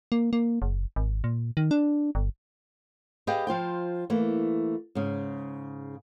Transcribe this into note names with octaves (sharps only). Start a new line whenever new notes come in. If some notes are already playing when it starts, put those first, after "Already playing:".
A#3
A#3
F#1
G#1
A#2
D#3
D4
G1
G4 G#4 B4 D#5 F5 G5
F3 F4 C5 G5
E3 A3 A#3
G#2 C#3